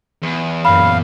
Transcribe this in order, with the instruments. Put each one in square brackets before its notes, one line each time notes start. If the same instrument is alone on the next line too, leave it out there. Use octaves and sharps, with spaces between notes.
[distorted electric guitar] E2
[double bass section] F#2 A#2 [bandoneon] F5 [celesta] B5